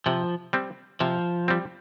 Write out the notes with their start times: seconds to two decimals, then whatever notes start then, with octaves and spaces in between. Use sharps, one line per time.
0.06 C3 F3
0.53 G3 C4
1.00 C3 F3
1.48 G3 C4